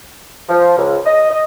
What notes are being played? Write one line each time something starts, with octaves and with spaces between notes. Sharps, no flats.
F3
C#2
D#5
D#5